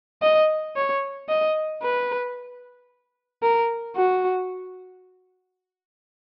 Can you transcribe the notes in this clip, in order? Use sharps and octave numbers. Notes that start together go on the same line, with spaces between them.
D#5
C#5
D#5
B4
A#4
F#4